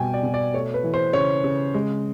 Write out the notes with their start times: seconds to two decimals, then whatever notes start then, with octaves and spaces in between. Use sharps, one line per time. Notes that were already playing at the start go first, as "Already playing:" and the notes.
Already playing: B2 G3 B3 G5 G#5
0.14 D5
0.23 B2
0.34 D5
0.54 A3 C#5
0.74 B4
0.84 E3
0.94 C5
1.13 C#3 C#5
1.44 C#3
1.74 G#3